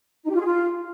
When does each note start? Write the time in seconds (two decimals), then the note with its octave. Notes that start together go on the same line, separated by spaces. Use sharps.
0.24 D#4
0.29 G4
0.34 F4
0.39 G#4
0.44 F4